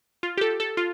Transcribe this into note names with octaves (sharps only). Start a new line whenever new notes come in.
F4
G4
A4
A4
F4